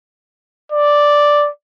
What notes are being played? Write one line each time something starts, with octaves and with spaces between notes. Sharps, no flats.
D5